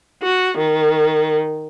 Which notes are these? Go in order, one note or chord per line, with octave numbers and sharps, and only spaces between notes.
F#4
D#3